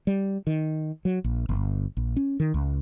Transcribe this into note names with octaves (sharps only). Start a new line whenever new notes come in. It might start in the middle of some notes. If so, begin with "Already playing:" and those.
G3
D#3
F#3
A#1
G1
A#1
C#4
D#3
C#2